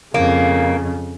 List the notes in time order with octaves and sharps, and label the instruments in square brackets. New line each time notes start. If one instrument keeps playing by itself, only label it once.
[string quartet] F2 C#3 [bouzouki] A#3